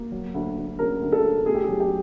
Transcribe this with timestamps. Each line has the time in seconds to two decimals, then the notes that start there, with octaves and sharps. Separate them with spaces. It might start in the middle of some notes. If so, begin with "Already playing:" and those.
Already playing: A#3
0.12 F#3
0.34 D2
0.57 D2
0.79 C#3 A#4
1.01 D2
1.12 A4
1.24 C#3
1.46 A3 G#4
1.55 G4
1.64 F#3 G#4
1.80 G4